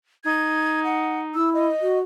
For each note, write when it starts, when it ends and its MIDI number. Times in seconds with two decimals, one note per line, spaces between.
0.25 1.35 63
0.25 0.83 92
0.84 1.19 78
1.35 1.67 64
1.35 1.50 88
1.54 1.98 75
1.81 2.01 66